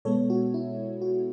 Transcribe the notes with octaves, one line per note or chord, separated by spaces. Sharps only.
B2 G#3 B3 A4 C#5
F#4
E4
F#4